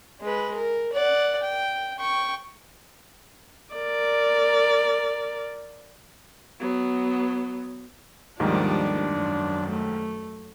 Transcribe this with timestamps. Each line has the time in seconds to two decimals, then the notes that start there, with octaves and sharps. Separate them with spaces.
0.21 G#3 B4
0.54 A#4
0.92 D5 F#5
1.43 G5
1.99 G5 C#6
3.75 A#4 D5
6.60 F#3 B3
8.40 D#2 G#2 D#3 F3 G3 A3 D4
9.11 F#2
9.69 A3